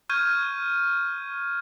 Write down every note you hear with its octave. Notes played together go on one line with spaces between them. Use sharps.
C#6 F6 G6 G#6 D#7